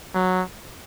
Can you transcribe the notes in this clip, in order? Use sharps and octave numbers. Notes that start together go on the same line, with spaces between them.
F#3